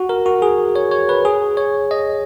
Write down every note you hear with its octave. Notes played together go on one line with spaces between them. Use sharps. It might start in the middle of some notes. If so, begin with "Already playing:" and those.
Already playing: F#4
A#4
F#4
G#4
C#5
C#5
B4
G#4
C#5
D#5